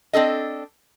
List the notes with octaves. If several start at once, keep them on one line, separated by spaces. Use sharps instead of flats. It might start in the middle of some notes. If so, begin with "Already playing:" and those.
C4 D4 A4 D#5